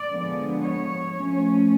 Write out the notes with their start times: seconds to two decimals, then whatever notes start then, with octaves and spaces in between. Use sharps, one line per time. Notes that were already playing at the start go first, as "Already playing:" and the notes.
Already playing: D5
0.08 D3 F3 G#3 B3
0.62 C#5
1.15 F3 A3 C#4